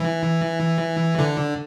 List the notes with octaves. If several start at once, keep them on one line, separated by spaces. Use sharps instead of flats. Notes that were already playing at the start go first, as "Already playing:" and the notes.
Already playing: E3
D3